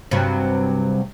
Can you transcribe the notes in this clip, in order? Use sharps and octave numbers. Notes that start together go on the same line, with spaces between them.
G2 C3 F#3